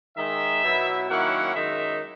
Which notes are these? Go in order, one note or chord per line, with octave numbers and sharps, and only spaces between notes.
D#3 G#3 D#4 E5
B2 F#3 B3 E4
D#3 F#3 A#3 C#4 E4 F#5
F#2 D#3 G#3 D#4 E5